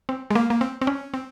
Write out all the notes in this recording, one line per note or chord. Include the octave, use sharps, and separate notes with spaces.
C4
G#3
A#3
A#3
C4
C4
C#4
C4